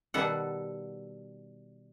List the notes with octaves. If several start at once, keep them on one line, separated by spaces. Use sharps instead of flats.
B2 D#3 G3 A4 F#5